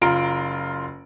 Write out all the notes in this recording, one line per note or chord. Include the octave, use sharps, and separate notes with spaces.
F#1 F4 A#5 D7